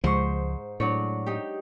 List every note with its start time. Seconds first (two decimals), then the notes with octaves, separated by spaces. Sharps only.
0.04 C#2 G#2 F3 C5 C#6
0.80 A2 F#3 D4 C#5
1.26 D#4 G4